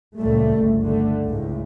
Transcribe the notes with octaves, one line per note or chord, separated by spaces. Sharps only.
C#2 A#2 G3 A3
G1 C#2
D3 A3
C#2 A2